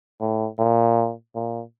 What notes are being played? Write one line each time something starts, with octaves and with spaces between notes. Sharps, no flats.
A2
A#2
A#2